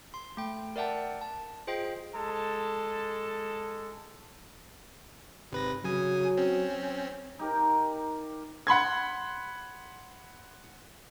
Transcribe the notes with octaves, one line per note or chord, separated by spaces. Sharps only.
C6
A3 G5
A#4 D5 E5 F#5 G5 A5
A5
F4 G#4 C5 D#5 G5 C7
G#3 A4 A5
G#1 C3 B4 A#6
C#3 F#3 G#5 D#6
C4 C#4
D#4 G4 A#4
F#5 B5 C6 G#6